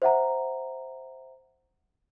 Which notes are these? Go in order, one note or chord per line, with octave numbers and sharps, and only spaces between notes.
C5 E5 F#5 A#5